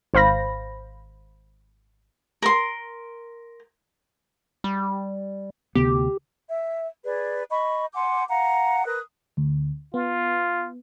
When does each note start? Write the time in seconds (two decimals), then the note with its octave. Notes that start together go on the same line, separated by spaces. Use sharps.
0.14 G#1 C5 F5 B5 A#6
2.42 A#4 C6
4.64 G3
5.75 D2 C3 B3 G4
6.48 E5
7.05 G#4 B4 D5
7.50 D#5 B5 C#6
7.94 F#5 G#5 C6 D6
8.29 F5 F#5 A#5
8.86 A#4 B4 D#6 F#6
9.37 D2
9.94 B3 F4